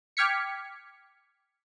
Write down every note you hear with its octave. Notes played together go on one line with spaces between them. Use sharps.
G5 D6 F6 G#6 B6 C#7